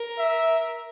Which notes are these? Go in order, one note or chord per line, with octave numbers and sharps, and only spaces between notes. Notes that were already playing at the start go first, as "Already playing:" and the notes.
Already playing: A#4
E5